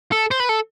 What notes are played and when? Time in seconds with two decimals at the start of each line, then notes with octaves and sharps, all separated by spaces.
0.12 A4
0.31 C5
0.40 B4
0.49 A4